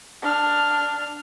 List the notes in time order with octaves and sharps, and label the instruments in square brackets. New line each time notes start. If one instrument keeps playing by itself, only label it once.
[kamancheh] D4 F6